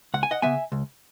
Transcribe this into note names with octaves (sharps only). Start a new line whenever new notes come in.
C#2 F#5
G#5
D#5 F#5
C#3 G#3 B3 E5 G#5
C#2